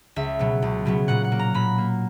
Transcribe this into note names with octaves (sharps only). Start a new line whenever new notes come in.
C#2 E5
B2 F#3 B3
C#2
B2 F#3 B3
A#2 F#5
F#5
A#3
A#5
A#2 B5
A#3